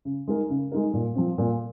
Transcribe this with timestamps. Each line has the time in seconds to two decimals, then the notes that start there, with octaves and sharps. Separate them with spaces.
0.05 C#3
0.28 G#3 D#4 A#4
0.50 C#3
0.72 G#3 D#4 A#4
0.94 A#2
1.15 F3 C4
1.38 A#2